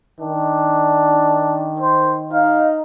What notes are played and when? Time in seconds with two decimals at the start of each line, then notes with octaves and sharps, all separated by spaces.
0.20 D#3 D4
1.80 C5
2.32 D#4 F5